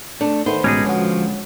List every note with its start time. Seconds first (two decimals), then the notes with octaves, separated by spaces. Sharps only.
0.21 A3 D4
0.46 D#3 A3 B3 C5
0.64 A1 B2 D3 G#3 C#4 D#4 G#4 D6
0.86 F3 C#4 F#4